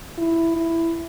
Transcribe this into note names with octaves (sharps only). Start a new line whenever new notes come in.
E4
E4